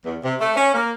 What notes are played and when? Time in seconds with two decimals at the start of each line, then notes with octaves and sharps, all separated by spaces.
0.04 E2
0.22 C3
0.40 A3
0.55 C#4
0.74 A#3